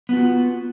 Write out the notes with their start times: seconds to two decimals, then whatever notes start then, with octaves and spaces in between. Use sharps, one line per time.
0.09 B3
0.13 F4
0.17 F#4